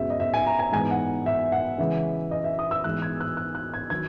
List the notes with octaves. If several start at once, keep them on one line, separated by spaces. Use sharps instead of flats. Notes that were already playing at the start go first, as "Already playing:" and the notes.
Already playing: F#2 C#3 G#3 B3 E5
D#5
E5
G#5
A#5
G#5
G#2 E3 B3 G#5
F#5
E5
F#5
C#3 E3 G#3 E5
D#5
E5
D#6
E6
G#2 E3 G#3 B3 F#6
G#6
F#6
F#6
F#6
G#6
D#3 F#3 G#6